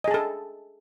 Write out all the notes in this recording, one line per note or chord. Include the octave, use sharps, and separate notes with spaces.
G#4 A4 D#5 A5